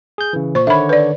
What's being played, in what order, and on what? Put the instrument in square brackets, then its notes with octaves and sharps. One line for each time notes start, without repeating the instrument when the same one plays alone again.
[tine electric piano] G#4 G6
C#3 E3
[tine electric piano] A#2 [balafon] C5 C#6
[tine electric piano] D3 D#3 C#5 [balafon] E5 B5
[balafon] B4 D5